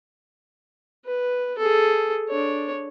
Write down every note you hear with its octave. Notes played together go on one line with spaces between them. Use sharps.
B4
G#4 A4
D4 C#5